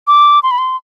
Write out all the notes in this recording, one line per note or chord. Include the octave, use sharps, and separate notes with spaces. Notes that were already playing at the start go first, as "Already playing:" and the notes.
D6
C6
B5
C6